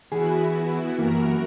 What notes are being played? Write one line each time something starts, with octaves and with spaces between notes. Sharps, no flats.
E3 B3 E4 F#4 G#4
F#2 E3 A#3 F#4 A#4